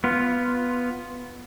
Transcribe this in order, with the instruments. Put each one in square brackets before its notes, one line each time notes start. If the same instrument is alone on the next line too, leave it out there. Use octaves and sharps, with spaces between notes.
[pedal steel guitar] B3 F4